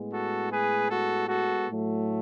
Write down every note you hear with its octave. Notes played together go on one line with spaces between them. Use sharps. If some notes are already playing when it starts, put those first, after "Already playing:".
Already playing: A2 G#3 B3
F#4 A4
G#4 B4
F#4 A4
F#4 A4
A2 F#3 A3